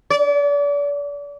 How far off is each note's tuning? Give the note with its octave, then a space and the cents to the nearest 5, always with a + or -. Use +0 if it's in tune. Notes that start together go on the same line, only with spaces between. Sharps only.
D5 -35